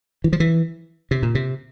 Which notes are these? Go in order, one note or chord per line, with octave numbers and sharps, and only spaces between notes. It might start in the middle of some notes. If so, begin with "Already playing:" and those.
E3
F3
E3
C3
A#2
C3